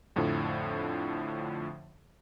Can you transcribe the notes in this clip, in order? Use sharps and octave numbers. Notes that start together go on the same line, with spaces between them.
F2 A2 D3 F3